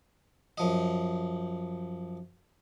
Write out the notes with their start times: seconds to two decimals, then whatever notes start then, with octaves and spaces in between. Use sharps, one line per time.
0.58 F#2 F3 D#5